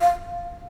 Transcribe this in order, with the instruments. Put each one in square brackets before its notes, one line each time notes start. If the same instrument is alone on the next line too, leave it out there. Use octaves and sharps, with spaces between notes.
[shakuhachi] F5